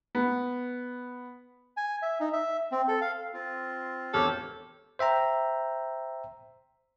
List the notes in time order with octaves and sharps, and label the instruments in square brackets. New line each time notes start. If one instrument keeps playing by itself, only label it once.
[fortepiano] B3
[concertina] G#5
E5
D#4
E5
C4
A4
F5
[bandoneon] C4 F4
[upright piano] E1 F6 [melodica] G4 C#5 [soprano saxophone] A4
[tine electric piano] C5 E5 G5 A#5